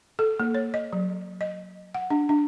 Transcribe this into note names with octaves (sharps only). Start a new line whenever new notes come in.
A4
A#3
C#5
D#5
F#3
D#5
F#5
D4
D4